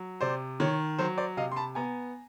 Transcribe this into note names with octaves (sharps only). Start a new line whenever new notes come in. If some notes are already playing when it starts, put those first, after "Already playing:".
Already playing: F#3
C3 C5 D5
D#3 C#5
F#3 C5
C5 D5
C3 D#5 F5
C6
A5 B5
B3 G#5 A#5